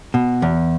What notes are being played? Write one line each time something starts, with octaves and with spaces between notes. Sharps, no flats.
B2
E2